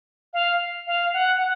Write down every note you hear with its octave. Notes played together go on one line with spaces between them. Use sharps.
F5
F5
F#5
F#5